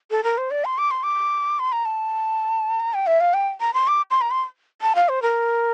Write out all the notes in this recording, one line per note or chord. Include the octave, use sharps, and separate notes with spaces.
A4
A#4
C5
D5
C6
D6
C6
D6
C6
A#5
A5
A#5
G5
E5
F5
G5
A#5
C6
D6
C6
A#5
C6
A5
F5
C5
A#4